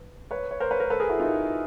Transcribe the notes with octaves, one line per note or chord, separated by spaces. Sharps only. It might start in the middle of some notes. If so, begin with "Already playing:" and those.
Already playing: B4
B4 C#5
C#5
A#4 C5
B4 C#5
A#4 C5
A4 B4
G#4 A#4
E4 F#4
D#4 F4